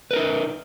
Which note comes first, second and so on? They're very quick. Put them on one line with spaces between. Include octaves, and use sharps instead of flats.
B4 A#4 D#4